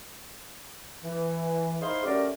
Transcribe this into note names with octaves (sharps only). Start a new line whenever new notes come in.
E3
D#4 E4 G#4 C5 F5 C6
F#3 A3 C#4 G4 A#4 D5